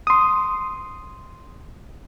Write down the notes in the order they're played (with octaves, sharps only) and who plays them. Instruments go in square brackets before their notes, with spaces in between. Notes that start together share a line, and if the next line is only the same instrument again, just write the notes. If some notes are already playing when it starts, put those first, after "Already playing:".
[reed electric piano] C6 D#6